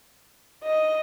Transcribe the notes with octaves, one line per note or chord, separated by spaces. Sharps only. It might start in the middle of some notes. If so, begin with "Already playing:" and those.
D#5